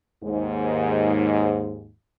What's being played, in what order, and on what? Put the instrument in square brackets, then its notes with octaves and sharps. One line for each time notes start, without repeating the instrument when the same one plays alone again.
[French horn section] D#2 G#2